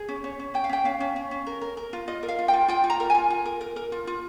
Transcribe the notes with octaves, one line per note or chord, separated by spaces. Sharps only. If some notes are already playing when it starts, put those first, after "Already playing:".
Already playing: G#4
C#4
C#4 C#5
C#4
C#4 G5
F5
C#4 G5
C#4 F5
C#4
C#4
C#4
A#4
A#4
A#4
F4
F4 D#5
A#4
F5
F4
G5
F4
F4 G5
F4
A#5
A#4
F4 G#5
F4
A#4
A#4
A#4
F4
F4